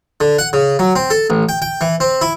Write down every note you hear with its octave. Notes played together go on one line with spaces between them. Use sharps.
D3
F#5
C#3
F#3
C4
A4
A1
G5
G5
E3
C4
E4